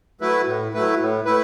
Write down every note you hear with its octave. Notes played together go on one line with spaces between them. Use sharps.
F#3 A3 E4 B4
A2
F#3 A3 E4 B4
A2
A3 E4 B4